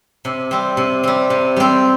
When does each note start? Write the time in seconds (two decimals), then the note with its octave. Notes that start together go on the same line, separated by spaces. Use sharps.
0.25 C3
0.51 G3 C4
0.77 C3
1.03 G3 C4
1.30 C3
1.56 G3 C4